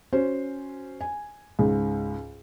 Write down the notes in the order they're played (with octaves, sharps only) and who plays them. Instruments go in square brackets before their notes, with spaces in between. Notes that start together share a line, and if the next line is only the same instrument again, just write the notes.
[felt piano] C#4 F#4 C5
G#5
C#2 G#2